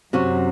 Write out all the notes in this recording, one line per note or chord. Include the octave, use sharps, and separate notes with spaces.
F#2 C3 F#3 C#4 F#4